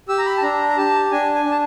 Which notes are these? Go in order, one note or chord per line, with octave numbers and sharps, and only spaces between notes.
G4 E6
A#5
B5
A5
D4 A#5
A#5
G4 A5
D4 G#5
G#5
D4
A5